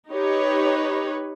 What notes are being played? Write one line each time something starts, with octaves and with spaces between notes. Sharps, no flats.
D#4 G4 B4 C#5